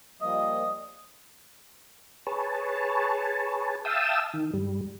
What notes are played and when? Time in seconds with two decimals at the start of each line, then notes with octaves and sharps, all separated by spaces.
0.21 F3 G3 A#3 D#5 D#6
2.27 G#4 B4 C#5 A5
3.85 E5 F5 G5 A5 D#6 E6
4.34 D#3
4.54 G2 G3